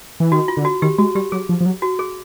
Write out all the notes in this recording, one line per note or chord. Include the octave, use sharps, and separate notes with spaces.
E3
D#3 F#4
F4
D3
F#4
D#3 G4
G#3 F#4
G3 G4
F#3 G#4
F3
F3
F#3
F#4
G#4